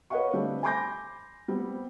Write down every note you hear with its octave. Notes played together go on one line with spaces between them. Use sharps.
B4 C#5 D#5 F5 F#5 C#6
D3 G3 A3 C4 D4
G#5 B5 C6 D6 G6 A#6
G3 B3 C4